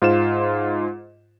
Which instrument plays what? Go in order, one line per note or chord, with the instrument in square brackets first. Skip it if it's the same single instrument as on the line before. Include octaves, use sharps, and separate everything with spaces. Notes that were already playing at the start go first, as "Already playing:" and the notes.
[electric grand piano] G#2 F4 C5 E7